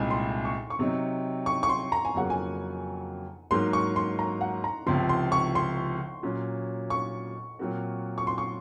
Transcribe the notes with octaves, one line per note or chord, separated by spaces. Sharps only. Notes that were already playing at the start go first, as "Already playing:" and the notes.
Already playing: C2 A#2 G#3 C4 D#4 G#5
C6
C#6
C#6
C3 F#3 C4 D#4
C#6
C#6
C6
A#5
G#5
F2 C#3 F#3 A#3 F#5
G#5
G#2 F#3 A#3 C6
C#6
C6
A#5
F#5
A#5
C#2 C3 F3 C6
C6
C#6
C6
A#2 F#3 C#4
C#6
A#2 F#3 C4 F#4 A#4
C#6
C6
C#6